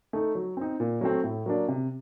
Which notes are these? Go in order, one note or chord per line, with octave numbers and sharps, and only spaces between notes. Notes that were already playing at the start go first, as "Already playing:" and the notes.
A3 D#4
F#3
C4 D#4
A#2
F#3 A3 C4
A2
F#3 A#3 D4
C3